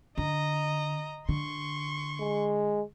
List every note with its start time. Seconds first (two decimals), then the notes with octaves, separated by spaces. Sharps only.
0.18 D3 D#5 A#5
1.29 D3 C6 C#6
2.20 G#3